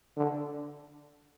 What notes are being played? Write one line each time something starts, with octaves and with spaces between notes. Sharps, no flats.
D3